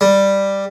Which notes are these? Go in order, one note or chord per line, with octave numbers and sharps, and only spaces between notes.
G3